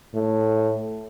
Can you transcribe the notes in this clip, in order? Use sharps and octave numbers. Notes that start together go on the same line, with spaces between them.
A2